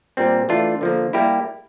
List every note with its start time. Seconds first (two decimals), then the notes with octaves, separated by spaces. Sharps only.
0.17 A#2 G3 C4
0.49 E3 A3 D4 F4
0.81 D3 F3 A#3
1.13 G3 A#3 E4 G4